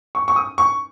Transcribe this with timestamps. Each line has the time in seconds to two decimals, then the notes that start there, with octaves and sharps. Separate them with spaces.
0.15 C#6
0.28 C#6
0.36 D#6
0.58 C#6